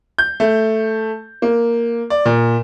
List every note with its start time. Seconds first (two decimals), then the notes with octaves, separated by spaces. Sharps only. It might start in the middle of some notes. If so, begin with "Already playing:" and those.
0.18 G6
0.40 A3
1.42 A#3
2.10 D5
2.26 A#2